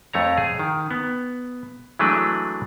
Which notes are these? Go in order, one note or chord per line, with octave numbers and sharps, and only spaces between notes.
F2 A3 C#5 A#5
G#4
D#3
B3
E3 F#3 G#3 A3 D4 B4